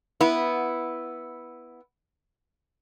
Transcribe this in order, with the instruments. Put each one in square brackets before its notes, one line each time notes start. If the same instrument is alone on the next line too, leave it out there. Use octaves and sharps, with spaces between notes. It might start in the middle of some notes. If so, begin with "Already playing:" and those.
[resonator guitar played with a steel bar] B3 E4